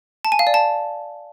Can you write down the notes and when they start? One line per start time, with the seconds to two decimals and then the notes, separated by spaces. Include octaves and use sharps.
0.25 A5
0.32 G#5
0.39 F5
0.47 D5
0.54 A5